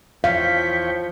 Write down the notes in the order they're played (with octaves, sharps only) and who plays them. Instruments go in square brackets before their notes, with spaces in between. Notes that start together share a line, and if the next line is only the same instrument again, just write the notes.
[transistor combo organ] E2 C#5 G5 [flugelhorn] F3 [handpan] F5 [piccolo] B6